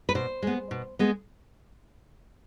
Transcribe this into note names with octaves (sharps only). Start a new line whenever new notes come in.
B4
B2 C5
G#3 B3
B2
G#3 B3